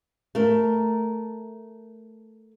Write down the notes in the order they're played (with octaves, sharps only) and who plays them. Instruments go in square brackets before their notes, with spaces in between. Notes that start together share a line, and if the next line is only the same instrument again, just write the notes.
[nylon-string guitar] A3 A#4